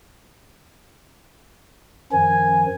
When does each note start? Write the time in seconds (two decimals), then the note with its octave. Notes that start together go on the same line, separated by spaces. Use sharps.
2.12 F#2 D#3 F3 G#5